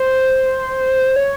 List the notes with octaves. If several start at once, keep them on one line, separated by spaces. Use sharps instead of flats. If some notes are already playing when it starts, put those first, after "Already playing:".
Already playing: C5
C#5